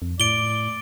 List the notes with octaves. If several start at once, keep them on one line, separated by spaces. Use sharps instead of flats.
F2
A2 D5 D7 G7